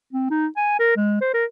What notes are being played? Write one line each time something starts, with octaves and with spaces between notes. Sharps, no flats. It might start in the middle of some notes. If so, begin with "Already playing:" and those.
C4
D#4
G#5
A#4
G#3
C5
A#4